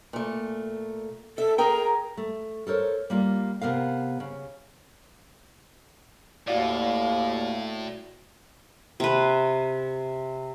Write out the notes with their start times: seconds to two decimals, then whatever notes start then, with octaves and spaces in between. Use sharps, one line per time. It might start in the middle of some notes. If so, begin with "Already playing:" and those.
0.13 A#2 A3
1.38 A4 E5
1.58 G#4 A#4 G5 A#5
2.17 A3
2.67 A4 A#4 C5 C#5
3.10 G3 A#3 F4
3.61 C3 B3 A#4 F5
4.20 C#3
6.48 D#2 A2 F#4 D5 F5
9.00 C3 B4